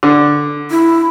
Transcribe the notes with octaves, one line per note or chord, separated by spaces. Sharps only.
D3
E4